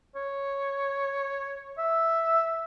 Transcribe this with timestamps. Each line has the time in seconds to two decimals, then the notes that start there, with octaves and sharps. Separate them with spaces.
0.15 C#5
1.78 E5